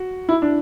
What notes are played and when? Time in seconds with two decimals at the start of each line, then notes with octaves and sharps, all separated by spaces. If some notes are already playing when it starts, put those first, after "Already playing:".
Already playing: F#4
0.29 E4
0.42 D4